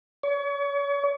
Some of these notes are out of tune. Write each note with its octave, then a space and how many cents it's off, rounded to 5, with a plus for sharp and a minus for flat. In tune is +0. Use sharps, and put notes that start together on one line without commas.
C#5 +35